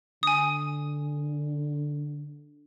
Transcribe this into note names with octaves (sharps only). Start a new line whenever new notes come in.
D3 G#5 D#6